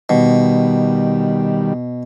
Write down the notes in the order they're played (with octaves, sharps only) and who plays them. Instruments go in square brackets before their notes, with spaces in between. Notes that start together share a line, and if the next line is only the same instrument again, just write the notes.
[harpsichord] B2 [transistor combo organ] D#3 G3